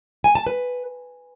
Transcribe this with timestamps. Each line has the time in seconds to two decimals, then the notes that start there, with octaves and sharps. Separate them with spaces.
0.24 G#5
0.35 A5
0.47 B4